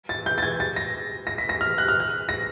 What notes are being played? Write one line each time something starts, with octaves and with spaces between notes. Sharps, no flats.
A6
G6
A6
G#6
A6
A#6
A#6
B6
A#6
F6
F#6
F6
F#6
A#6